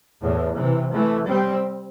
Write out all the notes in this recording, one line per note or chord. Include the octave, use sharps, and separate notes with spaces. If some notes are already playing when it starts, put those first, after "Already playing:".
E2 A2
C3 E3
E3 A3
G3 C4